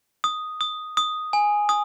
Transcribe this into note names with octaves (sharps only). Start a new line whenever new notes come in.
D#6
D#6
D#6
G#5
D#6